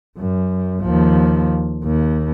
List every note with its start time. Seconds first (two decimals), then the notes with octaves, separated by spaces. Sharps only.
0.18 F#2
0.81 D#2 F3
1.84 D#2